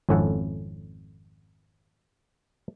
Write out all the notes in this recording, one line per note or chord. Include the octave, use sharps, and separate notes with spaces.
G#1 F2 C#4 E4 A4 F#5